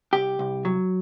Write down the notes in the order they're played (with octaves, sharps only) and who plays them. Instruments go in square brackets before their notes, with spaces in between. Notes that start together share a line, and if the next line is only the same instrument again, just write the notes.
[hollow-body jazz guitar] C2 G4
C2
F#3